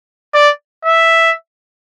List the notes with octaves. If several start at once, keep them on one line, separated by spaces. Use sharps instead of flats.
D5
E5